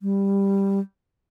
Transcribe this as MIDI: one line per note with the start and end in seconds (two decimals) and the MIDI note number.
0.02 0.80 55